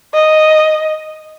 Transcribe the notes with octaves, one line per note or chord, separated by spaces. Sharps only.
D#5